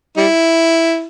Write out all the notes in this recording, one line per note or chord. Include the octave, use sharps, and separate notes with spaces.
G3 E4